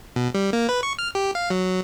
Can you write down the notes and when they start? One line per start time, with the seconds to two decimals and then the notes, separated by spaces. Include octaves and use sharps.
0.16 B2
0.35 G3
0.53 A#3
0.69 B4
0.83 C#6
0.99 F6
1.15 G4
1.35 F5
1.50 F#3